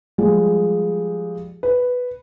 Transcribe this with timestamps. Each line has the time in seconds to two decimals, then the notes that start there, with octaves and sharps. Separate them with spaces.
0.18 F3 G3 G#3
1.63 B4